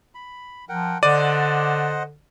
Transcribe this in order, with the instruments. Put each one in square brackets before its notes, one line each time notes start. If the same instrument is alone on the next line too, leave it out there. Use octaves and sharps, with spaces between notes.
[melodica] B5
[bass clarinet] F3 [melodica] A#4 F#5 G5
[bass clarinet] D3 [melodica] C5 D#5 F#5 [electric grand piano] D5 D#7